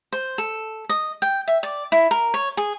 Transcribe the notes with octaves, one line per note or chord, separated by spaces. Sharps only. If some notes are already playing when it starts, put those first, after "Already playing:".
C5
A4
D#5
G5
E5
D5
E4
A#4
C#5
G#4